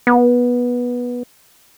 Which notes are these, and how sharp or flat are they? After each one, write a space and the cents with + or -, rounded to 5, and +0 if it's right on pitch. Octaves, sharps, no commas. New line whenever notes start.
B3 -15